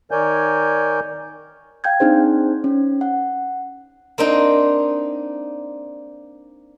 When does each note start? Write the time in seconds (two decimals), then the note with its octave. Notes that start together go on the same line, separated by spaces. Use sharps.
0.11 D#3 A#4 C#5 D5 G#5 G6
1.84 F5 G5 G6 G#6
2.00 C4 D4 D#4 G#4 C5
2.64 C#4
3.01 F#5
4.18 A#3 C4 D4 D#4